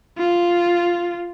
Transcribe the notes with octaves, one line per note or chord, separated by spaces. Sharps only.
F4